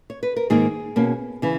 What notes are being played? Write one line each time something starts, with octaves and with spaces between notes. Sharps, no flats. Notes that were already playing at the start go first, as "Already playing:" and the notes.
C#5
B4
A#4
G#2 D#3 A#3 D#4 G#4
B2 A#3 C#4
C#3 E3